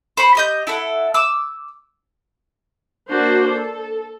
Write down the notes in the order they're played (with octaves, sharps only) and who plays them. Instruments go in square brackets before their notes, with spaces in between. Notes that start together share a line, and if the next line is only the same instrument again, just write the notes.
[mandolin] C5 B5 C#6
G4 D#5 G6
E4 A4 F#5
D6 E6
[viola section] A#3 D4 F#4 C5
A4